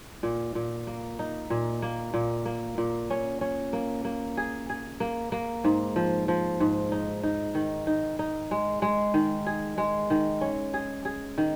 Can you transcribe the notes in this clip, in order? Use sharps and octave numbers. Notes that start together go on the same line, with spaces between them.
A#2
A#2
A#3
D#4
A#2
A#3
A#2
A#3
A#2
C#4
C#4
A#3
A#3
G#4
G#4
A#3
A#3
G#2
F3
F3
G#2
D#4
D#4
D#3
D#4
D#4
G#3
G#3
D#3
G#4
G#3
D#3
C#4
G#4
G#4
D#3